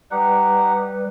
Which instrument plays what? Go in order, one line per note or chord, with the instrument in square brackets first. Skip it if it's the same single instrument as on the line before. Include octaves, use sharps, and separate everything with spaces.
[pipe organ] G3 B4 [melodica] D#4 G4 F#5